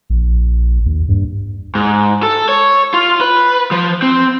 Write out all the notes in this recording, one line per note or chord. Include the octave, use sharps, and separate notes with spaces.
A#1
D#2
G2
G#2
A4
C#5
F4
B4
F3
C4